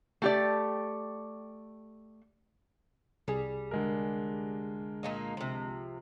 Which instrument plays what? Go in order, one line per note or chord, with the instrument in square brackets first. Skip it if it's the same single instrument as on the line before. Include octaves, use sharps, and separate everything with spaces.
[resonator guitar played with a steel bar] A3 G4 D5
[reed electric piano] C2 G#4 [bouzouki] G3
[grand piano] D3 G#3 A#4
[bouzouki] A#2 A#3 D#4
C3 F3